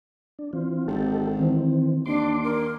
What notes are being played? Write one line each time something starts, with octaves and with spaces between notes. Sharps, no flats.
D4
E3 C4 F4
G#1 D#4 G4 A4
D#3 E3 C4
D#2 D4 C6 D6
A#4